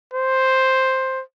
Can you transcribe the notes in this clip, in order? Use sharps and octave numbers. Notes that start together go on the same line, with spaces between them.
C5